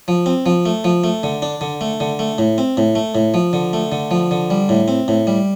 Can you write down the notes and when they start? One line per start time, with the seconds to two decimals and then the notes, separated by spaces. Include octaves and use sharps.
0.08 F3
0.26 C4
0.46 F3
0.66 A3
0.84 F3
1.04 A3
1.23 D3
1.42 D4
1.61 D3
1.81 A3
2.00 D3
2.19 A3
2.38 A2
2.58 C4
2.77 A2
2.95 A3
3.15 A2
3.34 F3
3.53 D3
3.73 A3
3.92 D3
4.11 F3
4.31 D3
4.50 G3
4.69 A2
4.88 C4
5.08 A2
5.27 G3